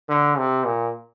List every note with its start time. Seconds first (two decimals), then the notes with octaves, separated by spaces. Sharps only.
0.09 D3
0.38 C3
0.66 A#2